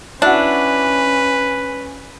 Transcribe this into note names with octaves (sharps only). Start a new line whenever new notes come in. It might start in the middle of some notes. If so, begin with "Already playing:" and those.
C#4 D4 E4 F#4 B4 F#5